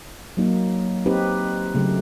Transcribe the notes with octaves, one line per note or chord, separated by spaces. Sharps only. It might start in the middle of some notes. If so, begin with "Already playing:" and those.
F#3 A#3 D#4
C4 D#4 G4 B4
C#3 F#3 A3